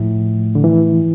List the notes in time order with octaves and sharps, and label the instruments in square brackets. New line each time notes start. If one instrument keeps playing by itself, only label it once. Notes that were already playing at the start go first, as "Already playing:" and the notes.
Already playing: [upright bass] A2 [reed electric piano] F3
[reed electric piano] D3
E3